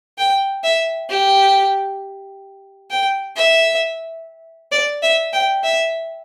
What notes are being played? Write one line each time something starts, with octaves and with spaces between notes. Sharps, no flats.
G5
E5
G4
G5
E5
D5
E5
G5
E5